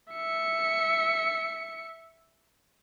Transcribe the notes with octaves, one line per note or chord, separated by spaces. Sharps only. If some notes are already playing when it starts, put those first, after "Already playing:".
E5 C#7